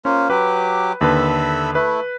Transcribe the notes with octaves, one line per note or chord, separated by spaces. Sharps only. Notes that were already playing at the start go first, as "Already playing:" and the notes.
A#3 C#4 F4 C5
F#3 G4 B4 D6
D#2 D3 A4 B4 E5 B5
A3 E4 B4